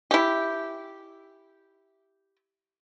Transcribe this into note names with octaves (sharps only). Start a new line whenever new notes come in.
E4 G4